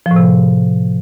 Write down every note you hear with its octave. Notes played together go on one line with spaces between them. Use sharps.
F3
A2
C3